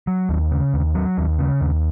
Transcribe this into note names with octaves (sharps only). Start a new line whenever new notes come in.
F#3
D#2
C#3
D#2
F#3
D#2
C#3
D#2